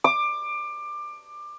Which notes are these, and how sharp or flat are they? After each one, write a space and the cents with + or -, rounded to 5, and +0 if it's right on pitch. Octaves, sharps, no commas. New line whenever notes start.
D6 +20